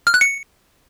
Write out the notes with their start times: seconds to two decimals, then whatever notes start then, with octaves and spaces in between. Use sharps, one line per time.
0.07 F6
0.14 F#6
0.21 C#7